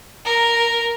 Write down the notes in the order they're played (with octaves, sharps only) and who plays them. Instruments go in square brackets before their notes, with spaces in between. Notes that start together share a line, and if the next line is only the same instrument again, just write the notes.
[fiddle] A#4